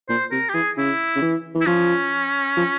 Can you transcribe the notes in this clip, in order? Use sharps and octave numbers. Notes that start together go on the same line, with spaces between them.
A#2 C5
C3 A#4
G4
E3 G#4
C#3 E4
C#3
E3
E3
E4
F3 C#4
F3